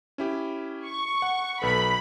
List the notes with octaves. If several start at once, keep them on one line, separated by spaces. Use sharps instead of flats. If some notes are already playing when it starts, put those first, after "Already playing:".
C#4 E4 G4
C#6
F#5
B1 A4 B4 B5